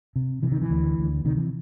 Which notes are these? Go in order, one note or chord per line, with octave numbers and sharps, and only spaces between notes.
C3
C3 E3
D#3
E3
D2
D2
C3 D#3
E3